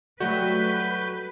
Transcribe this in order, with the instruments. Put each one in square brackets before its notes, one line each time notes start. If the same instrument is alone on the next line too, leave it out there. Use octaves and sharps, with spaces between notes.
[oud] F#3 G3 A3 [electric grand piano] F#4 [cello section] B4 [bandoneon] G6